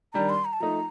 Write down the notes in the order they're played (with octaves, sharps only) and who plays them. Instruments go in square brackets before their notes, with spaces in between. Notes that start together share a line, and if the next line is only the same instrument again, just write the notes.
[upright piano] D#3 G3 D4 [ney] A#5
[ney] C6
A#5
A5
[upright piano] F3 A3 D#4 [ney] A#5